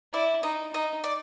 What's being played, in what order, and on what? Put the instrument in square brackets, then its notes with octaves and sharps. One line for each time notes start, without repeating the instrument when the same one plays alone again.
[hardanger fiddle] E4 [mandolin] D5
[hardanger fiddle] D#4 [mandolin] D#5
[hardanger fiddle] D#4 [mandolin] D#5
[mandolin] D5